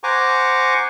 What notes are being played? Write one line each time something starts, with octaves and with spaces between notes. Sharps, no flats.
C5 F#5 G#5 A#5 C#6 D6